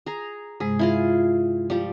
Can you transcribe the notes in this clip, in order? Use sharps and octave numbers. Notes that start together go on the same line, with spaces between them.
G#4 A#5
G2 C3 G#3 G#4
E4 F4 G#4
F3 G3